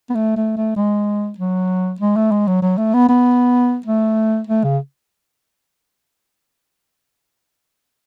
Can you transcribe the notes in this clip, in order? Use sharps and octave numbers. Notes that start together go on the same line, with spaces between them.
B3
A3
A3
A3
G#3
F#3
G#3
A3
G#3
F#3
F#3
A3
B3
B3
A3
A3
C#3